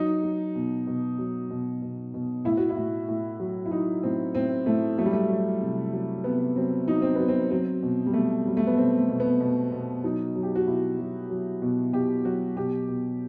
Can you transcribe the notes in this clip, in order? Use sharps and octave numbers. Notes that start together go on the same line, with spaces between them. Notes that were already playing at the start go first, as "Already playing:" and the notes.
Already playing: F#3 D#4
F#3
B2
B2
F#3
B2
B2
B2
A2 E4
F#4
E4
A2
A2
F#3
E4
F#3 D#4
A2 C4
A2 C4
A2 A3
F#3 A3
G3
A3
F#3
C3
F#3
C3 B3
F#3 C4
F#3 D#4
C4
F#3 B3
C4
F#3 C4
B2
G3
B2 A3
F#3 G3
A3
B3
B2 C4
A3
B2
B3
B2
B2
F#3 D#4
F#3
G4
F#4
B2 E4
F#3
F#3
B2
B2 G4
F#3 F#4
B2 G4
B2